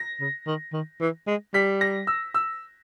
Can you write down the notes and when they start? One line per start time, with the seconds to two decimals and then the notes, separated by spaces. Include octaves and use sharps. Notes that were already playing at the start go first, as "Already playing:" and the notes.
Already playing: A#6
0.20 C#3
0.47 D#3
0.73 D#3
1.01 E3
1.27 G#3
1.54 G3 B6
1.81 A#6
2.07 E6
2.34 E6